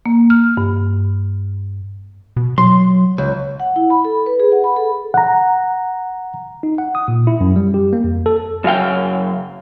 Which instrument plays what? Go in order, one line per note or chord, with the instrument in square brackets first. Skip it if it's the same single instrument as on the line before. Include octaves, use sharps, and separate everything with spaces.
[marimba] A#3
F6
G2
[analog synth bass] B2
[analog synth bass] F#3 [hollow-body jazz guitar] C6
[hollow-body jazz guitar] C#2
[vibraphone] F#5
E4
B5
A4
B4
G#4
F#5
B5
A4
[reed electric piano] F#5 A#5
[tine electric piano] D#4
F#5
D#6
A#2
E4
F#2
G3
G4
A#3
F2
A4
[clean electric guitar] F#2 C#3 F5 G5